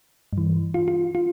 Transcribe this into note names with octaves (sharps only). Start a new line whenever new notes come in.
G2
E3
F4
F4
F4